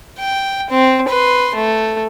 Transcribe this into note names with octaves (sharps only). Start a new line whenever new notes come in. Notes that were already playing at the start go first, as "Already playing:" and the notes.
G5
C4
B4 C6
A3